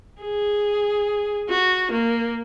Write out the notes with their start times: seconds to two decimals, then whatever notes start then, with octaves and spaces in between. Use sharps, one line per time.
0.21 G#4
1.49 F#4
1.92 A#3